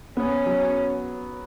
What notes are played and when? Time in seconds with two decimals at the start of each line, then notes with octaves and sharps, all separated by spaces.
0.17 B3 C#4
0.46 F#3